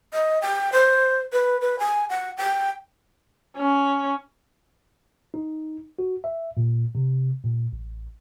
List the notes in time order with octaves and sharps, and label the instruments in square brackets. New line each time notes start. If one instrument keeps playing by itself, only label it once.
[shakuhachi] D#5
G5
C5
B4
B4
G#5
F#5
G5
[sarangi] C#4
[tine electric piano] D#4
F#4
E5
A#2
C3
A#2
A1